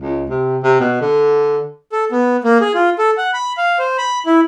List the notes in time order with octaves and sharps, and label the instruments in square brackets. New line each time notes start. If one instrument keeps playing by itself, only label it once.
[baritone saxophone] C#2
C3
C3
B2
D3
[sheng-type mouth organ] A4
B3
A#3
G#4
F4
A4
F#5
B5
F5
C5
B5
E4